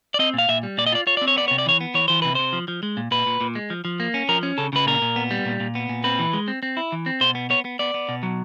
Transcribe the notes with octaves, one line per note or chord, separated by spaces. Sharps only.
D5
C4 D#5
A#2 F5
A#2 E5
G3
A#2 D5
D#5
F4 D5
F4 C#5
C4 D5
C#5
B3 D5
C3 C#5
D5
E3 C#5
B3
E3 C#5
E3 C5
C3 B4
C3 C5
F3
F3
G#3
A#2
A#2 B4
A#2
A#2
G#3
F3
F3
A#3
C#4
F3 A#4
C#4
C#3 A4
C#3 B4
A#2 A#4
A#2
B3
G3
A#2
A#2
B3
A#2
C4 B4
E3
G#3
C4
C4
E4
E3
C4
B2 C5
B3
B3 C#5
B3
B3 D5
B3
B2
F#3